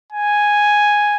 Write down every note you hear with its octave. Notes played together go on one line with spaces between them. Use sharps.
G#5